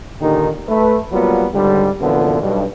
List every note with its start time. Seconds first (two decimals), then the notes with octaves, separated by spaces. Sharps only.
0.21 A#2 D3 D#3 D#4 G4
0.68 A3 B4
1.12 F#3 G3 A#3 B3 F4
1.53 C#2 G#2 D3 G3
2.01 F#2 A#2 D3 E3 F3 B3
2.42 B1 G2 B2